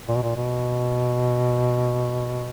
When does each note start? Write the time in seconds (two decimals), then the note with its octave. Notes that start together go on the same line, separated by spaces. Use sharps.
0.08 A#2
0.16 B2
0.23 A#2
0.36 B2